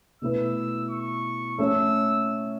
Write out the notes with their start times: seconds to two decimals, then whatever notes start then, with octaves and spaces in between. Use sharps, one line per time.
0.22 B2 A3 E4 B4 E6
0.90 C#6
1.58 A3 C#4 A4 C#5 E6